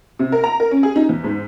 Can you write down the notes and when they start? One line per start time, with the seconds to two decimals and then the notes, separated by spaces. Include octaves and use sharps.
0.19 C3
0.32 A#4
0.44 A#5
0.60 A#4
0.71 C#4
0.83 G#4
0.96 D#4
1.09 E2
1.24 G#2